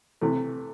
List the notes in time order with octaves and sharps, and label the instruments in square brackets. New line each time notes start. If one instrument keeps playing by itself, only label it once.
[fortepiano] C3 E3 A3